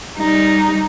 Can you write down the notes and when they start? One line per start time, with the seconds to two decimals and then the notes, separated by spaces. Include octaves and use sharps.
0.16 G3 D#4